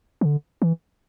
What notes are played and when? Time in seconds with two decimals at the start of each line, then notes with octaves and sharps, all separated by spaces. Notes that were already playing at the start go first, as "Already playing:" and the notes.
0.21 E3
0.25 D3
0.62 E3